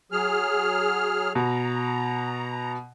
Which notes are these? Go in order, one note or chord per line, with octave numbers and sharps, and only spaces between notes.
F#3 G#4 F6
B2 A#5